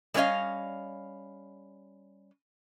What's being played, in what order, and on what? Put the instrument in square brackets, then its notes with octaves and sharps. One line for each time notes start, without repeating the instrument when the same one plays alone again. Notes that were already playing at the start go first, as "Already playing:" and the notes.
[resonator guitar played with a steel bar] G3 A3 C#4 C#5 D#5 F5